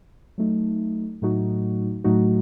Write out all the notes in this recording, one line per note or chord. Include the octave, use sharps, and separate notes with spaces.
F#3 A3 D#4
A2 F#3 A3 D#4 F#4
A2 F#3 A3 D#4 F#4